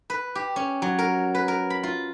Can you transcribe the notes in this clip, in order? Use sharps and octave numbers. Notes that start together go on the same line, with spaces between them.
B4
G4
C#4
F#3
A#4
B4
A#4
B5
F4